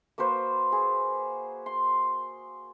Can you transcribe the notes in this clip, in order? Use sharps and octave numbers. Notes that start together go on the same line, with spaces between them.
A#3 F#4 B4 C5
G#4
C6